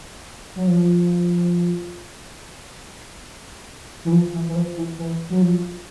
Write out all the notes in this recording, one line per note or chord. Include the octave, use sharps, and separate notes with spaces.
F#3
F3
E3
F3
E3
E3
F3
E3
E3
F#3
F3